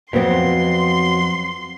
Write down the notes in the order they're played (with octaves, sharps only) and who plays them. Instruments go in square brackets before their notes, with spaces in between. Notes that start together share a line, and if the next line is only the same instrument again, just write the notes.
[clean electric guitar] F2 [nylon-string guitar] F#3 B3 C4 [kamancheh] C6